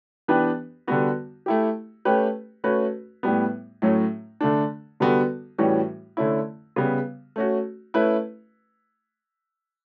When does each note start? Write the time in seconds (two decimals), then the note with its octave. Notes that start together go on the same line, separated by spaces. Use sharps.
0.28 E3 B3 D4 G4 B4
0.87 D3 G3 B3 F#4
1.46 A3 E4 G4
2.05 A3 C#4 G4 B4
2.64 A3 C#4 F#4 B4
3.23 A2 G3 B3
3.82 A2 F#3 A3 C#4
4.41 D3 A3 D4
5.00 D3 G3 B3 F#4 A4
5.58 A2 E3 G3 C#4 F#4
6.17 D3 A3 C#4 E4
6.76 C#3 G3 B3
7.36 A3 C#4 F#4
7.94 A3 C#4 E4 B4